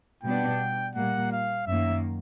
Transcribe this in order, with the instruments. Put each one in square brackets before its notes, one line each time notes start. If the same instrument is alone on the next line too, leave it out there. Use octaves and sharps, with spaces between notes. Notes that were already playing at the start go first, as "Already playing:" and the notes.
[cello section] B2 G3 B3 D4 [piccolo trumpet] G5
[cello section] A#2 G3 A#3 [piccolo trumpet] F#5
[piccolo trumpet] F5
[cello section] F#2 D#3 F#3 A#3 [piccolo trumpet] E5